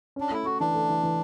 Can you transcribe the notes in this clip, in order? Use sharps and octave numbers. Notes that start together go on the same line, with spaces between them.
C#4 D4
A3 E4
A3 F#4
E3 D4
A3
E3
E3